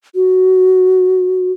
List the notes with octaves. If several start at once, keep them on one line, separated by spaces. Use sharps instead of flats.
F#4